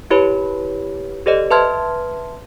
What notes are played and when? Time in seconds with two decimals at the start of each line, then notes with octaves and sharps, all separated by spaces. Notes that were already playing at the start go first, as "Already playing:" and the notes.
0.10 E4 G4 B4 C#5 B5
1.26 G4 A4 C5 D5 D#5
1.51 B4 E5 A5 C6 F6 G#6